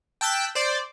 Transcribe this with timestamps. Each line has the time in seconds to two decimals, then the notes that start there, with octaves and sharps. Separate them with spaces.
0.21 G5 A5 E6 F#6 B6
0.55 C5 D5